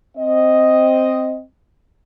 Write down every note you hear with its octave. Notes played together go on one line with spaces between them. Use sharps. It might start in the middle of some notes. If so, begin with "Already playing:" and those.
C4 D#5